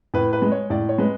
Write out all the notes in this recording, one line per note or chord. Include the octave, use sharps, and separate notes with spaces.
A2 B4
B4
G#3
C#5
A2 D5
C#5
G#3 B4